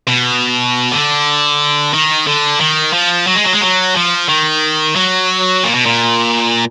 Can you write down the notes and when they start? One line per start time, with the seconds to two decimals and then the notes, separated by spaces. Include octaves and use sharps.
0.08 B2
0.92 D3
1.93 D#3
2.27 D3
2.60 D#3
2.93 F3
3.27 F#3
3.35 G#3
3.44 F#3
3.53 G#3
3.61 F#3
3.96 F3
4.29 D#3
4.95 F#3
5.64 A#2
5.74 B2
5.86 A#2